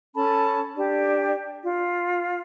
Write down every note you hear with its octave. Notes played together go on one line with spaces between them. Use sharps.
C#4 A4 A5 B5
D4 G4
F4